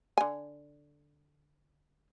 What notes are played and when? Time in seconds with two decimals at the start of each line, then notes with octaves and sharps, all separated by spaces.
0.18 D3 G#5